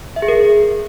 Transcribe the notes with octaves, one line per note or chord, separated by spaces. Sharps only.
E5
G#4
A#4